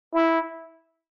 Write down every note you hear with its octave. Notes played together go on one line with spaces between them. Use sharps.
E4